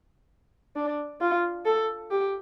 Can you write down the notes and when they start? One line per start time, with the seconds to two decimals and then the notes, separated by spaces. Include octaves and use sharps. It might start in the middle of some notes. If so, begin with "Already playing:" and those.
0.76 D4
1.21 F4
1.66 A4
2.11 G4